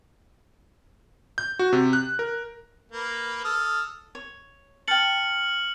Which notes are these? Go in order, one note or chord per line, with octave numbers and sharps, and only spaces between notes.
G6
F#4
C3
F#6
A#4
A#3 B4
A4 D#6 F6
C#5
G5 A5 F6 C#7 F#7